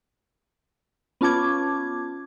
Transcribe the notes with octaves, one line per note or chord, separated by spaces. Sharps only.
B3 C#4 F4 A5 D6 G#6